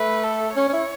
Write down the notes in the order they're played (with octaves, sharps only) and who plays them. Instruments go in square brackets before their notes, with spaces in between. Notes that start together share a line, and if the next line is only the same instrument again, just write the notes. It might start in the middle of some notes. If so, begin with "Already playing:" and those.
Already playing: [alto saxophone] A3 [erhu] B4
[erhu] A4
[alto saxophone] C#4 [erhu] C#5
[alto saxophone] C#4
E4